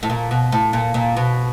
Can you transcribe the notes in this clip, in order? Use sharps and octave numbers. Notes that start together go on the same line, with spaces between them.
A2
A#2
B2
A2
A#2
A#2
B2